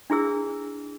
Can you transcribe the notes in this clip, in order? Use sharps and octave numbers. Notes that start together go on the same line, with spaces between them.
D4 E4 G#4 E6